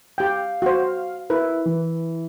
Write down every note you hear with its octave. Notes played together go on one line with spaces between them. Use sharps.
G4 F5 G5
F#4 C5
E4 A#4 B4
E3